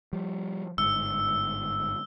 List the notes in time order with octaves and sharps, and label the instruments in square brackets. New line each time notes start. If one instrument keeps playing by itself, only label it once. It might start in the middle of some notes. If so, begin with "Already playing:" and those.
[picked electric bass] F3 G3
[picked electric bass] G1 G#2 [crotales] E6